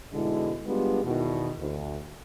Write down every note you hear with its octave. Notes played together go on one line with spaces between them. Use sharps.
G#2 B2 D3 G#3 E4
G3 G#3 B3 D4 F4 G4
E2 B2 D#3
D2